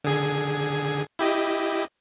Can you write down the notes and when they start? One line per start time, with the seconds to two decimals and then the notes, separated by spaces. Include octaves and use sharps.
0.04 D3 G#4 G#6
1.19 E4 G4 D#5